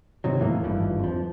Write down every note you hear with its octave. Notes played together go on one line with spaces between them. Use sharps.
G#2 C3 D#3 F#3
E2 A2 E3 A#3
G#1 G2 E3 F3
F2 F3